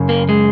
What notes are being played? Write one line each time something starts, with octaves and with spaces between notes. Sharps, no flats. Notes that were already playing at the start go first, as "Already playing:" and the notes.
Already playing: F#2 C#3
A#3
G#3